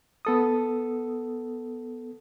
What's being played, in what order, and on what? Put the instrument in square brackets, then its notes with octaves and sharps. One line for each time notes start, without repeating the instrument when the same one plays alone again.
[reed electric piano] B3 A4 D#6